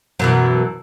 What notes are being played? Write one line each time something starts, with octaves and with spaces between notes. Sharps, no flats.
F#2 B2 E3